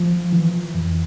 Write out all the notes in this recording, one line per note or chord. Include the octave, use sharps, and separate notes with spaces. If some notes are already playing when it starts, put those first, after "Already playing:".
Already playing: F3
E3
F2